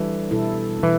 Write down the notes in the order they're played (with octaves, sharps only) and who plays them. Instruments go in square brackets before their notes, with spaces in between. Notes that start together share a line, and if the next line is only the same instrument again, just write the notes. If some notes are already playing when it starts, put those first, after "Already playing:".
Already playing: [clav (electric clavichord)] E3 [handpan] G3 D4 A4
[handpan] B2 G3 E4 A4
[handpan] B2 [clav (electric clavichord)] E3